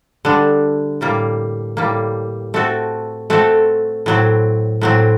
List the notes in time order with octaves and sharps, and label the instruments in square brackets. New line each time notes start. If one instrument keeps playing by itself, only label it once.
[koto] D3 G3 D4
A2 G3 A#3
A2 G3 A#3
A3 C4 F#4 A4
A3 C4 F#4 A4
A2 F#3 C4
A2 F#3 C4